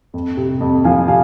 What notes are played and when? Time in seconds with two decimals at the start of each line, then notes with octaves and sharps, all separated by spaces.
0.14 F2
0.37 C3
0.61 F2
0.84 F3 F5 G#5
1.08 C3 F5 G#5